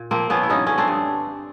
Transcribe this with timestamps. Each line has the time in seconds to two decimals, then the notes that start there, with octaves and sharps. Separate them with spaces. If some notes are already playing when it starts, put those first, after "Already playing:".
Already playing: A#2
0.11 F3 A#3 C4
0.30 F3 B3 C#4
0.43 E4
0.49 G2 C#4 D#4
0.67 D3 C#4
0.78 C4 D4
0.88 G2